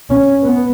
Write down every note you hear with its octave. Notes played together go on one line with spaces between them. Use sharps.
C#4
B3